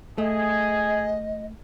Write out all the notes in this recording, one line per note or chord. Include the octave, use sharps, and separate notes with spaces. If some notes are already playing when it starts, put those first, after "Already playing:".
A3 G#4 D#5